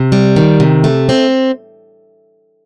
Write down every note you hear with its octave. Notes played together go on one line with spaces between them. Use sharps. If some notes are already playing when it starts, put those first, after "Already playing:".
Already playing: C3
G3
D#3
C3
A3
C4